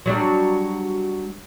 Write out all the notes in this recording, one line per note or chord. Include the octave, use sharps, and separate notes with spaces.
F#3 G3 D4